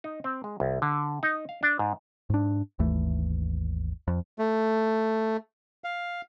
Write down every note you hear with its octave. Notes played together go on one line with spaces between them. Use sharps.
D#4
C4
G#3
C2
D3
D#4
F5
D4
G#2
G#2 D4
G#1 D#2 E3 A3
F2
A3
F5